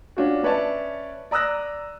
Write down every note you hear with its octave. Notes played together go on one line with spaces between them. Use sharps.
C#4 D4 F4 F#4
C#4 B4 C#5 D5 E5 A5
D5 A#5 D#6 E6 F#6 A#6